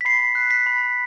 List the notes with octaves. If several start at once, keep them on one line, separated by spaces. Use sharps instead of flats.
B6
B5 C7
F#6
B6
B5